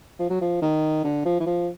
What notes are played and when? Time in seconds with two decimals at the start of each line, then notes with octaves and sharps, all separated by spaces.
0.19 F3
0.30 F#3
0.41 F3
0.62 D#3
1.04 D3
1.25 F3
1.40 E3
1.46 F3